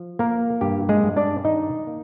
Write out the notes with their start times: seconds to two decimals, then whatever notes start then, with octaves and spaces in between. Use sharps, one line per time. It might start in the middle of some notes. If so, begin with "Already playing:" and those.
Already playing: F3
0.19 A#3 A#4
0.61 G2 G4
0.89 G#3 G#4
1.03 G2
1.17 D4 D5
1.45 D#3 D#4 D#5
1.87 A#3